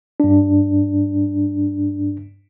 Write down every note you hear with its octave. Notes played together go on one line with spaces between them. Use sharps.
G2 D4